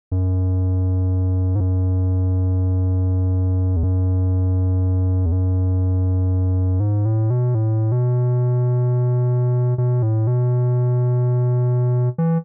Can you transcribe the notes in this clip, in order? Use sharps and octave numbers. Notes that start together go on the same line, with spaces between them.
F#2
G#2
F#2
E2
F#2
E2
F#2
G#2
A2
B2
A2
B2
B2
A2
B2
E3